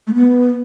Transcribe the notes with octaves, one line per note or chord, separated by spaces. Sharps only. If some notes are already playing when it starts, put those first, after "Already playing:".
A3
B3